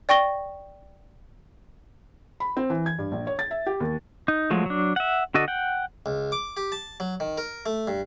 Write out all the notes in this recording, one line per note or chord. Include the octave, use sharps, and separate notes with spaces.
D5 G5 C#6 A#6 G7
B5
C4
E3
G#6
G2
A#1
C#5
A6
E5
G4
D#2
D#4
F3 F#3 G#3 A3
F#3 D4
E5 F#5
D3 F#4 A4 D#5
F#5 G5
C#2
D6
G4
A5
F#3
D#3
A#4
A3
G2